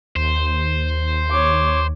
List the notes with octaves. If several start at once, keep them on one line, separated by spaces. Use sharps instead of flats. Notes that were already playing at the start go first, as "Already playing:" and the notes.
D#2 C5
C#5 D6